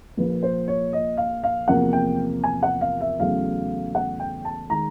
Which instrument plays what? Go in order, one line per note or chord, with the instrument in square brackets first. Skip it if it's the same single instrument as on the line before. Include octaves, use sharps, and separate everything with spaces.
[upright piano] A#1 A#2 F3 A#3 B4
C5
C#5
D#5
F5
F5
E2 C3 F3 A#3 F#5
G5
G#5
F#5
F5
E5
E2 C#3 F#3 A3 C#4 F5
F#5
G5
A5
D#3 G#3 A#5